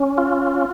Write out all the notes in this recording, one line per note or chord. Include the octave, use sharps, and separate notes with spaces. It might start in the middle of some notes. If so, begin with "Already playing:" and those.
Already playing: C#4
F4